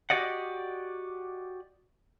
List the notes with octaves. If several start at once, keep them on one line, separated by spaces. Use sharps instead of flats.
F#4 G4 D5 D#5 F#5